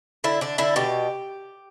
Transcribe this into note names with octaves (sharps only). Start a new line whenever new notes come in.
D3 E4
D3 D4
D3 E4
B2 G4